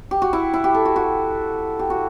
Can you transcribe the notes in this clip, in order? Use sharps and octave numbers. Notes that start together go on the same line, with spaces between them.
G4
F#4
E4
E4
G4
A4
F#4
F#4
G4
F#4